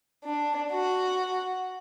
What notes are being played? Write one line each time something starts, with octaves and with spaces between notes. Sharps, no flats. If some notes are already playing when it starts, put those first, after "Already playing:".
D4
F#4